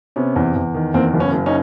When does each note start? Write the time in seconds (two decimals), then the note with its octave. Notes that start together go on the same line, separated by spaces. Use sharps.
0.16 C3 B3 C#4
0.36 E2
0.56 E2
0.74 D#3
0.94 E2 A#3 C4
1.14 F#1
1.20 B3 C#4
1.33 F#1
1.46 C#4 D#4